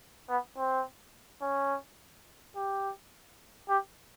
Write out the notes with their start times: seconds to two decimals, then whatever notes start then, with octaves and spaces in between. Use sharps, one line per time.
0.29 B3
0.58 C4
1.42 C#4
2.56 G4
3.69 G4